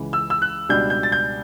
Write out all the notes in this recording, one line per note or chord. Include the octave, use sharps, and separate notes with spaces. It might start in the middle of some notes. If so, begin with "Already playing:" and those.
Already playing: C#2 C#3 E3
E6
E6
F#6
C#2 B2 G3 D4 G6
G6
A6
G6